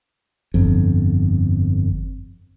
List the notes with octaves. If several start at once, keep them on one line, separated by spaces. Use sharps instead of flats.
G1 F2